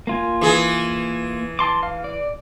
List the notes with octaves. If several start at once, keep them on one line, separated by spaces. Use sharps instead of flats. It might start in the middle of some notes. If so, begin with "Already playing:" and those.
A#3 F4 G#5
E3 G#4
A5 C6 D6
F5
D5